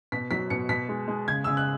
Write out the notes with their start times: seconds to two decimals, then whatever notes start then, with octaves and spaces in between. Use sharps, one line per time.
0.12 B2 B6
0.31 F#3 B6
0.50 B2 C#7
0.69 B2 B6
0.89 G#3
1.08 G#3
1.28 C#3 G#6
1.44 C#3 E6
1.57 F#6